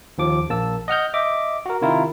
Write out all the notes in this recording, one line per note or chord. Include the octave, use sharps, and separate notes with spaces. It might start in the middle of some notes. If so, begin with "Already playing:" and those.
D#2 F3 D6
A#1 A#3 A5 E6
D#5 F#5 F6 G6
D#5 E5 D6
F#4 A#4
C3 D#3 E4 F4 A#4